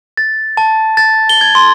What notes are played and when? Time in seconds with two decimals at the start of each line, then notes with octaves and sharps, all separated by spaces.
0.17 A6
0.57 A5
0.97 A6
1.29 G7
1.41 G#6
1.55 C6